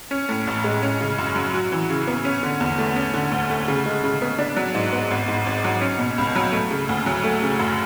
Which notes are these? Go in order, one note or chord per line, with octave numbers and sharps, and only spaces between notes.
C#4
A2
A1
G#3
C#4
C#3
F#2
F#3
F#4
E3
C#3
B3
C#4
D3
E2
A3
C#4
D3
D2
A3
C#3
G#3
C#3
B3
D4
F#3
G#2
B3
G#1
G#2
G#1
F#3
C#4
B2
C#2
F#3
A3
C#3
D2
F#3
A3
C#3
F#2